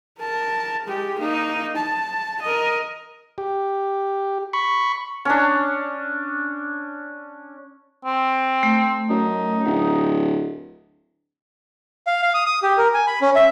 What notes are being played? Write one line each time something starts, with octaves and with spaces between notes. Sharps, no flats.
A#4 A5
G#3 G4
A#3 D#4
A5
A#4 D#5
G4
B5 C#6
C#4 D4
C4
A3
F#2 D#4
D1
F5
F5
D#6
D#6
G4
A#4
G#5
B5
C#4
E5